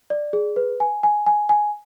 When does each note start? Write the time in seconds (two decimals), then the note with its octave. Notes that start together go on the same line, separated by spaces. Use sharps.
0.10 D5
0.33 G#4
0.56 B4
0.80 G#5
1.03 G#5
1.26 G#5
1.49 G#5